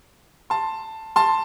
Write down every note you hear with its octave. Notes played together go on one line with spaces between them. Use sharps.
A5 C6
A5 C6